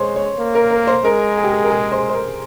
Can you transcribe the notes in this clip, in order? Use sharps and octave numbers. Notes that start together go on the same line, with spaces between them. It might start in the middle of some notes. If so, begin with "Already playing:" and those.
Already playing: G#3 C5 C#5
C#5
A#3
A#4
A#4
C5
G#3 A#4
G#4
G4
G#4
A#4
G#4
C5
C5
A#4